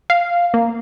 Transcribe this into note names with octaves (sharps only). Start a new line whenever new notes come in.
F5
A#3